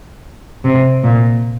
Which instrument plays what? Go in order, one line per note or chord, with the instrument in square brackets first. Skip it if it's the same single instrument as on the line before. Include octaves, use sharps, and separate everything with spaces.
[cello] C3
A#2